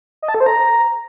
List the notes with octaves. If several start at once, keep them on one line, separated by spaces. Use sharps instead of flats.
D#5
A5
A4
C5
A#5